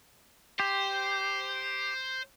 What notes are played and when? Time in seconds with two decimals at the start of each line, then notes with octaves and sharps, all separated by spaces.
0.60 G4 C5